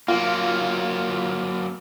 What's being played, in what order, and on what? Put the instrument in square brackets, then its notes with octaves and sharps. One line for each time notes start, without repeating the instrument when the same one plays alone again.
[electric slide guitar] F#3 A#3 [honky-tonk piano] F4